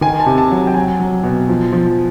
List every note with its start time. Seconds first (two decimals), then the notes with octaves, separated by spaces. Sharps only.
0.01 D#3 G#5
0.20 A5
0.26 C3
0.38 A5
0.51 F#3
0.67 G5
0.74 F#3 G#5
1.00 F#3
1.23 B2
1.49 F3
1.73 F3